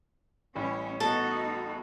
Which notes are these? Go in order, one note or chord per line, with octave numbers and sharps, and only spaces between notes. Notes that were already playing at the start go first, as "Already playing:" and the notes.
A1 A2 G3 C#4
B3 D#4 F#4 A4